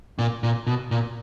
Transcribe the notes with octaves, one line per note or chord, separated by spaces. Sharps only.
A#2
A#2
B2
A#2